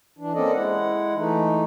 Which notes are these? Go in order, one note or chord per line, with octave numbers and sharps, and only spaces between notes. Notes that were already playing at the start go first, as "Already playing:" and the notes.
E3 D4
A#3 C4 C#4 A4 D5 D#5
G#3 E4 F#5
E3 A3 D#4